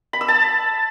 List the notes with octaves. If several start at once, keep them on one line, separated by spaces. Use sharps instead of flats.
B5
E6
A5